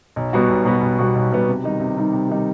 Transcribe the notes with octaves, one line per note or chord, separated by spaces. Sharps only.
B1
B2 G3 B3 F#4
B1
B2 G3 B3 F#4
B1
B2 G3 B3 F#4
B1
B2 G3 B3 F#4
C3
D#3 G3 D#4
C3
D#3 G3 D#4
C3
D#3 G3 D#4